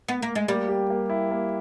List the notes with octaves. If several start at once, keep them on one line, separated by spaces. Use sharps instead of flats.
B3
A#3
G#3
G3 A#3
G4
A#3
E4
A#3